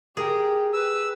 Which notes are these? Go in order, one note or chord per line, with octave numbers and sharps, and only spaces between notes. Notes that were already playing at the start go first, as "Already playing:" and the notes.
G4 G#4 A#4
B4 E6